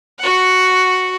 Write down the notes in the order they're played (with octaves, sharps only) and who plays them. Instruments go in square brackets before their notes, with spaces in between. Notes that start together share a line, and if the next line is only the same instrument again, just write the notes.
[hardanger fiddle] F#4 F#5